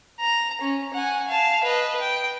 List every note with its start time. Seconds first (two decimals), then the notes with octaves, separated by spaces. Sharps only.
0.20 A#5
0.61 C#4
0.94 F#5 G#5
1.28 F5 A5
1.64 B4 D#5
2.01 G5